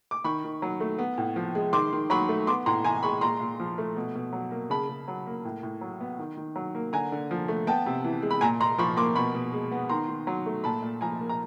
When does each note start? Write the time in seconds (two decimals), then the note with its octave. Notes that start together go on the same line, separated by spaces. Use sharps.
0.11 D6
0.24 D#3 B5 C#6
0.44 D#3
0.62 F#3
0.80 A3
0.98 B3
1.18 A2
1.36 F3
1.55 G#3
1.73 D#3 C6 D6
1.92 D#3
2.10 F#3 B5 C#6
2.29 A3
2.47 B3 C6 D6
2.66 A2 A#5 C6
2.84 E3 G#5 A#5
3.03 G#3 B5 C#6
3.21 A#2 A#5 C6
3.40 A#2
3.60 F3
3.78 A3
3.97 B2
4.15 B2
4.33 F#3
4.51 A#3
4.70 C#3 A5 B5
4.89 C#3
5.08 F#3
5.26 A#3
5.45 A2
5.63 A2
5.81 F#3
6.00 B3
6.19 D#3
6.37 D#3
6.56 F#3
6.75 A#3
6.93 D3 G#5 A#5
7.12 D3
7.31 F3
7.48 A3
7.67 B3 G5 A5
7.86 C3
8.04 E3
8.22 G#3
8.31 B5
8.41 A#2 G#5 A#5
8.60 A#2 A#5 C6
8.78 F3 B5 C#6
8.97 A#3 C6 D6
9.15 B2 B5 C#6
9.35 B2
9.53 G#3
9.71 B3
9.89 D#3 A#5 C6
10.08 D#3
10.27 F#3
10.46 A3
10.64 A#2 A5 B5
10.83 A#2
11.01 F3 G#5 A#5
11.21 A#3
11.29 A#5